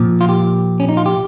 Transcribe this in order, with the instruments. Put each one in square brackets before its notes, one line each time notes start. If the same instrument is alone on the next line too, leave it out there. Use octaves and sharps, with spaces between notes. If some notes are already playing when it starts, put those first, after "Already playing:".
Already playing: [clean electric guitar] A#2 F3
F4
G4
C#4
D#4
F4
G4